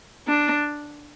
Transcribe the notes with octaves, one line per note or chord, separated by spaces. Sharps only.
D4